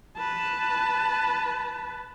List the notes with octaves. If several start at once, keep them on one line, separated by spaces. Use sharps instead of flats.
B4 A5